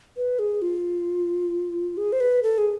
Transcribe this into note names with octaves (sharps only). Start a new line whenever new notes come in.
B4
G#4
F4
G#4
C5
B4
A4
G#4